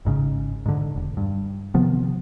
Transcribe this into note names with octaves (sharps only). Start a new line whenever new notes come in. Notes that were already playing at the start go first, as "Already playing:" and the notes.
G#1 G#2 C#3
G#2 D3
E1
G2
C3 D#3 F3 B3